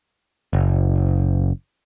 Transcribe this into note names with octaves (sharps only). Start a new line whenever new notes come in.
F#1